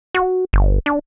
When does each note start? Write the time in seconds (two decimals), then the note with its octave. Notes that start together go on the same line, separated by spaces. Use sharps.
0.14 F#4
0.53 G1
0.86 D4